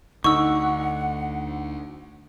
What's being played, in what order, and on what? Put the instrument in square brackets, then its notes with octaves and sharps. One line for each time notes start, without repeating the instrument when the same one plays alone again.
[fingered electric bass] D2 D3 [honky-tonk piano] D#4 [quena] F#5 [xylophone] C#6 E6